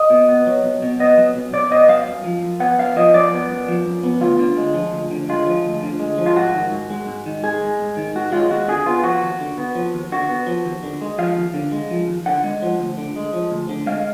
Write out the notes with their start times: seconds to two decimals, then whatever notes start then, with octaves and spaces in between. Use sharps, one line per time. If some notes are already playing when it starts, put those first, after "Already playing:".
Already playing: D#5
0.10 B2
0.28 B3
0.47 F#3
0.64 B1
0.82 B2
1.00 B3 D#5
1.18 F#3
1.35 B1
1.53 B2 D5
1.71 B3 D#5
1.88 F#3 F5
2.08 F#2
2.24 F3
2.43 F#2
2.60 B3 F#5
2.78 F#2 F5
2.96 F3 D#5
3.14 F#2 D5
3.33 B3
3.51 F#2
3.68 F3
3.85 F#2
4.03 B3
4.21 D2 F4
4.39 D3
4.57 G#3
4.75 F3
4.93 D2
5.11 D3
5.29 G#3 F4
5.46 F3
5.65 D2
5.83 D3
6.00 G#3
6.18 F3
6.26 F4
6.36 G#2 F#4
6.54 D#3
6.72 G#2
6.90 G#3
7.07 G#2
7.26 D#3
7.43 G#2 G#4
7.61 G#3
7.79 G#2
7.97 D#3
8.15 G#2 F#4
8.32 G#3 F4
8.50 D#2 F#4
8.68 D3 G#4
8.86 B3 F4
9.04 F3 F#4
9.22 D#2
9.40 D3
9.58 B3
9.75 F3
9.94 D#2
10.12 D3 F#4
10.29 B3
10.47 F3
10.65 D#2
10.83 D3
11.01 G#3
11.18 F3 F5
11.36 D#2
11.54 D3
11.72 G#3
11.91 F3
12.08 D#2
12.26 D3 F#5
12.44 G#3
12.62 F3
12.80 D2
12.97 D3
13.16 G#3
13.33 F3
13.52 D2
13.69 D3
13.86 G#3 F5